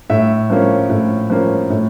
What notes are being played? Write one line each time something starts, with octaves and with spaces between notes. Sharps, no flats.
A2 E5
F3 A#3 C#4
A2
F3 A#3 C#4
A2